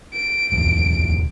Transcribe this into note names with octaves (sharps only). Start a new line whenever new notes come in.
D7
D1 E2 G#2